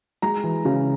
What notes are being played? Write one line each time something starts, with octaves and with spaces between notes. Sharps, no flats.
G#3 A#5
E3
C#3